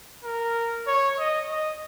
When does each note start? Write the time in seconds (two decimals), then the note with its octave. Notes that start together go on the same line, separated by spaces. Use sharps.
0.24 A#4
0.87 C#5
1.19 D#5
1.51 D#5